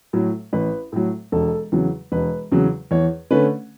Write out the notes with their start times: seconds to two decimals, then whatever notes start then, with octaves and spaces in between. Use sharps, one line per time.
0.13 A2 F#3
0.53 A1 B4
0.92 A2 F#3
1.32 E1 A4
1.72 E2 C#3 F#3
2.12 E1 B4
2.52 E2 C#3 F#3
2.91 E2 C#5
3.31 D3 A3 C#4 B4